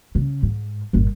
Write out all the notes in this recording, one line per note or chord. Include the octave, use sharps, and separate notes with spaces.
C#3
G#2
G1 A#2